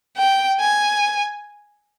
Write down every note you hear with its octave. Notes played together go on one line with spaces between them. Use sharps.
G5
G#5